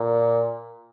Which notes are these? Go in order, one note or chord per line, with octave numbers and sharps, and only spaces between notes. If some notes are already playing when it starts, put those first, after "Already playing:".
Already playing: A#2